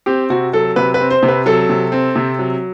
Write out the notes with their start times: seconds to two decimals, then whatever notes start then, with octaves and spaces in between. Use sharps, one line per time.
0.06 C4 G4
0.30 C3 F#4
0.53 F#3 A4
0.76 C3 B4
0.94 B4
1.00 C4
1.10 C5
1.23 C3
1.28 B4
1.46 F#3 A4
1.69 C3
1.92 C4
2.16 C3
2.39 F#3